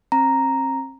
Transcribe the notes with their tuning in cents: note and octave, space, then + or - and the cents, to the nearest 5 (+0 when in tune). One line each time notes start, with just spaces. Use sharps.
C4 +40 A#5 +0